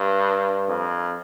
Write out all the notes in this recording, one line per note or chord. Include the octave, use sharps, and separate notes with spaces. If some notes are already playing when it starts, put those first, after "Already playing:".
Already playing: G2
F2